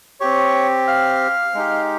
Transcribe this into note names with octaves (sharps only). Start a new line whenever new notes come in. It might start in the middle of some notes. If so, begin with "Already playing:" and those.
C4 G4 C#5 C#6
F5 F6
G#3 D#4 G4